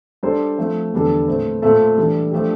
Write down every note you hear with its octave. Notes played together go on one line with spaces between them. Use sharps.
G3 D4 A4 C5
F3 A3 C4
E2 D3 G3 D4 A4
A#2 A3 C4
A#2 A3 C4 F4 A4
E3 G3 D4 A4
F3 A3 D4 G4